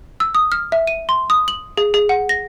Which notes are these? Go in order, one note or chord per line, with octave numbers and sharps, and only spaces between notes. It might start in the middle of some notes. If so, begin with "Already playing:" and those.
E6
D#6
F6
E5
D#7
C6
D#6
F#7
G#4
G#4
F#5
A#6